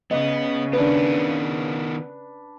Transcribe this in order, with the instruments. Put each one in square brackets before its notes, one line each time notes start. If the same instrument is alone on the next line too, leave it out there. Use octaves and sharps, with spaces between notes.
[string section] C#3 [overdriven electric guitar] B3 [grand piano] D#5
[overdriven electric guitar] D#3 B3 [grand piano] D4 B4